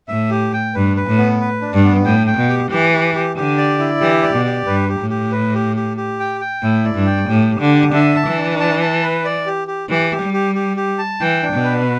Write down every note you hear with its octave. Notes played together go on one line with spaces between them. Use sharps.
A2 E5
G4
G5
G2 B4
B4
A2
B3
B4
D4
G2
B3
A2 G5
G5
B2
G4
E3 G4
G4
G4
D3 G4
D5
E4
E3 G4
D5
B2
G4
G2 B4
G4
A2
G4
B4
G4
G4
G4
G5
G5
A2 E4
D5
G2
G5
A2 G4
G4
D3
D4
D3 E5
A5
E3
D4
A5
A5
B4
D5
G4
G4
E3 G4
G4
G3
G4
G4
G4
A5
E3 G5
D4
B2
B4